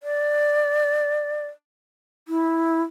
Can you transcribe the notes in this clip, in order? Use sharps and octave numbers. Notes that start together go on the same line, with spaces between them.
D5
E4